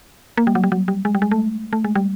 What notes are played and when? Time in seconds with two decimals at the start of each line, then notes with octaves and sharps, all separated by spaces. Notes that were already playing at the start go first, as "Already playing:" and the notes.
0.37 A#3
0.47 G3
0.55 F#3
0.64 G3
0.72 F#3
0.88 G3
1.05 G#3
1.15 G3
1.22 G#3
1.31 A3
1.73 A3
1.84 G#3
1.95 G3